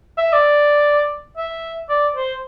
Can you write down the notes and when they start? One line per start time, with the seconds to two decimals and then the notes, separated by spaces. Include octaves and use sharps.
0.18 E5
0.32 D5
1.37 E5
1.89 D5
2.15 C5